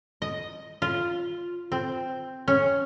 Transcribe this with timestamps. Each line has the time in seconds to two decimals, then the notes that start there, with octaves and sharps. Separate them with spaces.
0.22 D#5
0.82 F4
1.72 C4
2.48 C#4